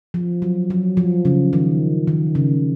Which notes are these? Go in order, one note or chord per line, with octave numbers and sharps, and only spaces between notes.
F3
F#3
F#3
F3
C#3
D#3
D#3
C#3